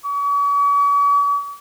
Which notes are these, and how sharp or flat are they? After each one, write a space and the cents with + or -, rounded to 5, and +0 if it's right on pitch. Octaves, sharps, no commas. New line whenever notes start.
C#6 +45